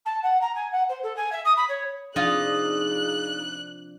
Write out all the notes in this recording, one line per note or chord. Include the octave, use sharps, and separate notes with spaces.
A5
F#5
A#5
G#5
F#5
C5
A4
G#5
E5
D#6
B5
C#5
C3 F3 D4 D#4 F4 G#4 D#5 F#6